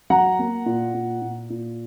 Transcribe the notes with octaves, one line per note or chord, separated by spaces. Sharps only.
F#3 F#5 A#5
A#3
A#2
A#2
A#2
A#2